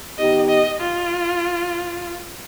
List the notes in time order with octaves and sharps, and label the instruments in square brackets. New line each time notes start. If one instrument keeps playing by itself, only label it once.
[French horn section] D#3 B3 D#4 G4 [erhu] D#5
[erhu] D#5
F4